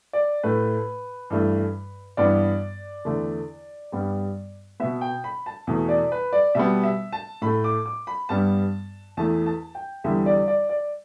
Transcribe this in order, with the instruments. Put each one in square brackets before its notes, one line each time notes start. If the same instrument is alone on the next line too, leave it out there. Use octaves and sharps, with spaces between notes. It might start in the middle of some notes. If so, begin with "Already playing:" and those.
[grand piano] D5
A2 A3 B4
G2 E3 A3
G2 E3 B3 D5
E2 D3 A3
G2 G3 B3
B2 B3 E5
G5
B5
A5
E2 B2 A3
D5
B4
D5
B2 G3 B3 E5
E5
A5
A2 A3 B5
D6
D6
B5
G2 G3 B3 A5
E2 E3 A3 A5
A5
G5
E2 D3 G3 E5
D5
D5
D5